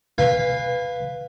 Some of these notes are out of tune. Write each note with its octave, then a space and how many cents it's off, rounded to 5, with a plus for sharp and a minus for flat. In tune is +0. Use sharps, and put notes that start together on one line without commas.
B4 +0 F5 +0 G#5 -40